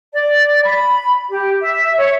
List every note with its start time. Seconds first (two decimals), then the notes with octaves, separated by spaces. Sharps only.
0.13 D5
0.64 B5
1.30 G4
1.59 E5
1.96 C#5